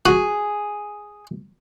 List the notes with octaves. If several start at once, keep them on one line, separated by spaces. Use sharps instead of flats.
F#4 G#4